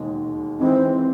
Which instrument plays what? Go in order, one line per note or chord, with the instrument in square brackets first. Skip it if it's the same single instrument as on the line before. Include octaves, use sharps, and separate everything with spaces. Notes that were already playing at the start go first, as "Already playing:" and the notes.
Already playing: [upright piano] E1 D#2 D#3 G#3
[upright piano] G#2 E3 G#3 [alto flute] C4